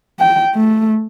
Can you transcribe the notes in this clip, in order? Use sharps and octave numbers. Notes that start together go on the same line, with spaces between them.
G5
A3